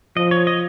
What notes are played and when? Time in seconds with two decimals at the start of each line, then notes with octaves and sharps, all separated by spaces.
0.16 F3 D#5
0.31 C#5
0.47 D#5